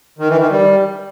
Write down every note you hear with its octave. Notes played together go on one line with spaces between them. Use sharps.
D#3
E3
D#3
G3